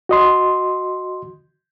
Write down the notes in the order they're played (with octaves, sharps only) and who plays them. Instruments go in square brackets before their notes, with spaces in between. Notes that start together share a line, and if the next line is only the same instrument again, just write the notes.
[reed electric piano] F#4 D#5 C6